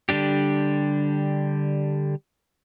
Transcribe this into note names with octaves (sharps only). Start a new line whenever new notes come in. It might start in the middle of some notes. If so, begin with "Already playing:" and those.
D3 G3 D4 G4